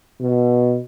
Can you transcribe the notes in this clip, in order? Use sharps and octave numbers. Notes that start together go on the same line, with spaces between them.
B2